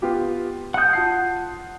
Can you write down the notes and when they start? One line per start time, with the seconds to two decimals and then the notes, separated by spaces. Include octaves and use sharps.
0.02 B3 F4 G4
0.74 F#5 D#6 F#6 G6
0.93 F4 A5 C7